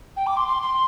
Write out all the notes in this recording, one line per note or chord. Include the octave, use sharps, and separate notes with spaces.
G5
D6
C6
C6
C6